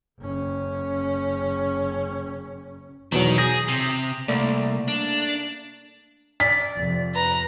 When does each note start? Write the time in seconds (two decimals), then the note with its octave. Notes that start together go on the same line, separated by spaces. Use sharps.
0.20 F#1 C#4
3.12 E2 B2 D#3 F#3
3.38 G#4 D#6 G6 A#6
3.68 C3
4.28 C2 A3 A#3 D5
4.88 D4
6.40 D5 B6
6.77 F2 C3
7.15 B4 A#5